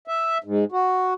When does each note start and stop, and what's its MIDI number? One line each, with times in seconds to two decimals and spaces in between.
0.08 0.38 76
0.44 0.65 44
0.72 1.14 66